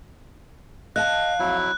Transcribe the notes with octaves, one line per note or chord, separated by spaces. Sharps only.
D#5 F5 A5 F#6
F2 F#3 E4